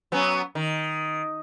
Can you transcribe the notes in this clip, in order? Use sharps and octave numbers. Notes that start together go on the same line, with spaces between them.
F#3 B3 C#4
D#3